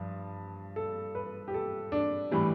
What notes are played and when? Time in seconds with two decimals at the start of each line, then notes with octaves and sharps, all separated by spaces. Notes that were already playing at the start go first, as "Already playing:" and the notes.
Already playing: G2 F3
0.76 A4
1.15 B4
1.48 G4
1.54 A4
1.92 D4
2.31 A2 E3 G3